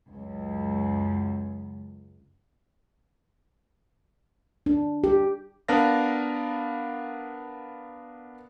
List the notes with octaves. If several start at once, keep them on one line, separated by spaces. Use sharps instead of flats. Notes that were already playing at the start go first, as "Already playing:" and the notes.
C#2 F#2
D4
G4
B3 D4 A#4 F5 A5 A#6